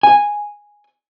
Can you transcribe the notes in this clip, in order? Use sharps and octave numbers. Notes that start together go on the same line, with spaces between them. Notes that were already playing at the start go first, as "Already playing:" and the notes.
G#5